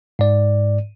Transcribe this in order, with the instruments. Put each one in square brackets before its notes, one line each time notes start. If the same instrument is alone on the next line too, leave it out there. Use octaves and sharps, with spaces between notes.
[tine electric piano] G#2 D5